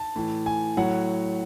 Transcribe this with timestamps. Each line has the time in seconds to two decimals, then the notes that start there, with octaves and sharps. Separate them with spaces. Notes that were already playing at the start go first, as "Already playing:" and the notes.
Already playing: A5
0.16 A2 E3
0.46 G#5
0.77 A2 F#3 F#5